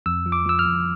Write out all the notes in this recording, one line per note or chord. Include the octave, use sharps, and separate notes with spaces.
F2 E6
F3
D6
F3 E6
F6
F2